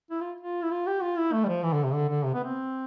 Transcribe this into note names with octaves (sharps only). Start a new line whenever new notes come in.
E4
F4
F4
E4
F4
G4
F4
E4
A3
G3
F3
E3
D3
C3
D3
D3
C3
B3
C4